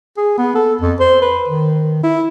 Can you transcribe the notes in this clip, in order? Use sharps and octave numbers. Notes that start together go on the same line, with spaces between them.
G#4
B3
A4
F2
C5
B4
D#3
E4